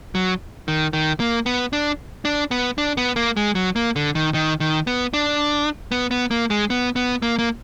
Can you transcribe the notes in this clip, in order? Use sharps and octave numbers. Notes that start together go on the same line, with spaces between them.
F#3
D#3
D#3
A#3
B3
D4
D4
B3
D4
B3
A#3
G#3
F#3
A#3
D3
D#3
D#3
D#3
B3
D4
B3
B3
A#3
G#3
B3
B3
A#3
A#3